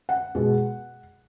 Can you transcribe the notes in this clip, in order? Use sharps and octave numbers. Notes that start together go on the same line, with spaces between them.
F#5
B2 G#3